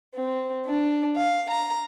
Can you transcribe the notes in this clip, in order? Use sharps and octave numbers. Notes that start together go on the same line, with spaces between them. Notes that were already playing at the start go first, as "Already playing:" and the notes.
C4
D4
F5
A#5